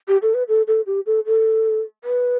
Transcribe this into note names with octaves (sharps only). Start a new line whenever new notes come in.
G4
A4
B4
A4
A4
G4
A4
A4
B4